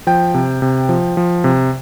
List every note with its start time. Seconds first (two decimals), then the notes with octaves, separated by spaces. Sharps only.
0.07 F3 G5
0.34 C3
0.62 C3
0.89 F3
1.17 F3
1.44 C3